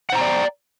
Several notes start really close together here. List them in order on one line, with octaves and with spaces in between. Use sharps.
F#5 C5 A#5 G5 D5